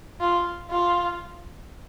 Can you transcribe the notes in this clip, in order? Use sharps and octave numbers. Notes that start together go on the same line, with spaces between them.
F4
F4